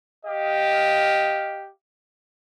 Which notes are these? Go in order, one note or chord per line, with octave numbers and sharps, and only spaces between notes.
G4 D#5 F5